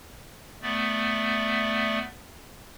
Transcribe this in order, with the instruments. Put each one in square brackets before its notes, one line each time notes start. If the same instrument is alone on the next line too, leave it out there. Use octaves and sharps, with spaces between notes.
[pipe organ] A3 B3 D5